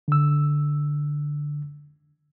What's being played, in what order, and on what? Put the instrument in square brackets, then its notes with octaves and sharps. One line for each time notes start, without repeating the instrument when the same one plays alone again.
[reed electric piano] D3 E6